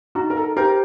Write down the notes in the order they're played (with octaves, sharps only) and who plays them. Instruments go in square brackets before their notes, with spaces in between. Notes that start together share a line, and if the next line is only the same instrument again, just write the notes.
[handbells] D#4 [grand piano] F#4
[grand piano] A#4
A4
[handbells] G4 C5 [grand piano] A#4